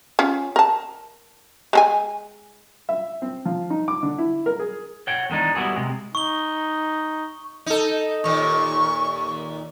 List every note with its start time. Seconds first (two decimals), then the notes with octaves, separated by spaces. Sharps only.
0.19 C#4 F4
0.56 A#4 A5
1.73 G#3 A4 G#5
2.89 E5
3.22 C4
3.45 F3
3.70 D#4
3.88 D6
4.03 D3
4.18 E4
4.46 A#4
4.59 G#4
5.07 C#5 F#5 G5
5.30 E2 D#3 G#3 D4 D#4
5.55 G3 B3 E4 F#4 G#4
5.76 C3 G#3
6.15 D#4 C#6 G7
7.66 D#4 A4
8.24 D#2 A#2 C#6